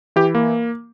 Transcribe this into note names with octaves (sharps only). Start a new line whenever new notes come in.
E3 G4
A#3